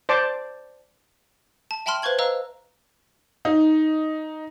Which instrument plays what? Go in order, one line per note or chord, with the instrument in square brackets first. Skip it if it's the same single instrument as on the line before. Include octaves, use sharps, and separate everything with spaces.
[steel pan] C5 D5 A5 D6
[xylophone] A5
E5 G5 A5 B5 C6 F6
B4 C5 F5 C#6 G#6 F#7
B4 C5 D#5 F5 A#5 E6
[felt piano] D#4